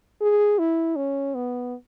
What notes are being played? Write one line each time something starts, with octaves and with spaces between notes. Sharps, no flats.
G#4
E4
C#4
B3